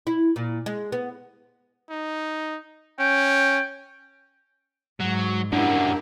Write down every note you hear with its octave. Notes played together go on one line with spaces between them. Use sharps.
E4
A#2
G#3
B3
D#4
C#4 G5
G#2 F#3
F#2 D3 D4 E4 G4 A#4 F#5